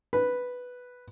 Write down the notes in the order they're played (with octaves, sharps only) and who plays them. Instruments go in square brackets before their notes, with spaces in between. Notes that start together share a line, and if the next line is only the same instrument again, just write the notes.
[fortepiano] B4